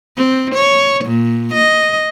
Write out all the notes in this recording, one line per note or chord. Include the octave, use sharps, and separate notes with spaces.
C4
C#5
A#2
D#5